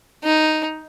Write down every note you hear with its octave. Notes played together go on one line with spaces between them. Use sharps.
D#4